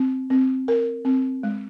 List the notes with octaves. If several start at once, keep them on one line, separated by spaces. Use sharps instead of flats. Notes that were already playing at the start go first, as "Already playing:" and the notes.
Already playing: C4
C4
A#4
C4
G#3